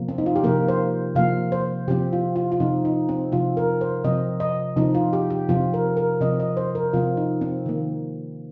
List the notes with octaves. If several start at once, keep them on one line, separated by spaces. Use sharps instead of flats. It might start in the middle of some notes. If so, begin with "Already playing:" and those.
Already playing: C3 F3 A#3
C4
D#4
F4
G4
C3 F3 A#3 A#4
C5
C3 F3 A#3 F5
C5
C3 F3 C4 G4
F4
F4
F4
C3 F3 C4 D#4
D#4
C4
C3 F3 C4 F4
A#4
C5
C3 F3 C4 D#5
D#5
C3 F3 C4 D#4
F4
G4
G4
C3 F3 C4 F4
A#4
A#4
C3 F3 C4 D#5
D#5
C5
A#4
C3 F3 C4 F4
D#4
C4
D#3 A#3